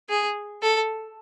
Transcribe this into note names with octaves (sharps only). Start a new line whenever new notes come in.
G#4
A4